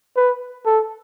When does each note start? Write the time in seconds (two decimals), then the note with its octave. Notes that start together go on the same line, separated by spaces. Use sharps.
0.17 B4
0.66 A4